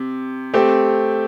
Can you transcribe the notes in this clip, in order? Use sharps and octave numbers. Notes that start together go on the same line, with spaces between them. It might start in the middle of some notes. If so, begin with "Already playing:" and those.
Already playing: C3
A3 C4 G4